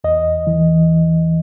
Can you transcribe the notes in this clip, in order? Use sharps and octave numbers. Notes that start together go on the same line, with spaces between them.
E2 D#5
E3